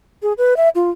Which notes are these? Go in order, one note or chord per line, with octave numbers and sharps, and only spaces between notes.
G#4
B4
E5
F4